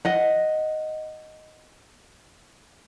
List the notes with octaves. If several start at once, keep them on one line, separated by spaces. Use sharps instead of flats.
D#5 F#5